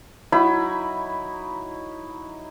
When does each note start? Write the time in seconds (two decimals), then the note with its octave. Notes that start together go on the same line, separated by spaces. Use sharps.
0.32 F#3 D#4 E4 B5